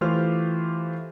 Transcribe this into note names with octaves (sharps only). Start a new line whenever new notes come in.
E3 A3 F4 G4 C5 F6